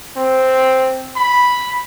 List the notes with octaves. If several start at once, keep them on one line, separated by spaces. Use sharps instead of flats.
C4
B5